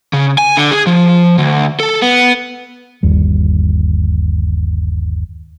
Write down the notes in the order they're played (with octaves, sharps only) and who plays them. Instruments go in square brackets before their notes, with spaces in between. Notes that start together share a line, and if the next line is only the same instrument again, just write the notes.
[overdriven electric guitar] C#3
G#5
D3
G#4
F3
D2
A4
B3
[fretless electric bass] G1 D#2 G3